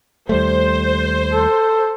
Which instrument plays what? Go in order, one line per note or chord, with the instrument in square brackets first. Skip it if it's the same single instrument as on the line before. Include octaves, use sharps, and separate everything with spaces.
[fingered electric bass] D#2 G3 A3 [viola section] C5
[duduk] A4